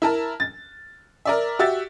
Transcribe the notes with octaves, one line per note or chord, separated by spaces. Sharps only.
E4 A#4 A5
A6
A#4 D5 E5
F#4 G4 E5 A6